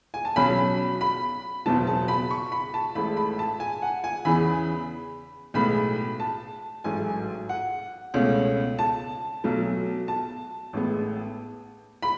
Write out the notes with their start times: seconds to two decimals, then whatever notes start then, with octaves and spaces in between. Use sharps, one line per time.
0.14 G#5
0.25 A5
0.36 B1 B2 F#3 C#4 B5
1.01 B5
1.66 F#1 E2 B2 F#3 B3 A5
1.87 A5
2.08 B5
2.31 C#6
2.52 B5
2.74 A5
2.95 A1 A2 G#3 B5
3.17 B5
3.39 A5
3.60 G#5
3.82 F#5
4.04 G#5
4.25 E2 C#3 E3 B5
5.54 B1 A2 G#3 B3 B5
6.20 A5
6.84 A1 G#2 F#3 A3 G#5
7.49 F#5
8.14 C#2 B2 A3 C#4
8.79 A5
9.44 B1 B2 F#3 A3
10.08 A5
10.73 A1 A2 G#3 B3
12.02 B5